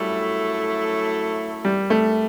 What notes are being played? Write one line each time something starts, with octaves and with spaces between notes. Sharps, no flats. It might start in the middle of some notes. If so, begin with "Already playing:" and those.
Already playing: F#2 F#3 G3 A3 E4
G3
A3